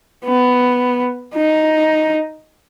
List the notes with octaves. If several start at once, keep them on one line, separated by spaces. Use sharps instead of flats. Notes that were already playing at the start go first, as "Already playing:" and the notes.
B3
D#4